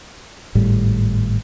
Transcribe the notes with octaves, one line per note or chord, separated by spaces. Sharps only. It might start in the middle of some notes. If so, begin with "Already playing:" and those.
G#1 A2 G3